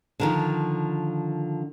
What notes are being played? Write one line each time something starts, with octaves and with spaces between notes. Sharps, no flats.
D3 D#3 F3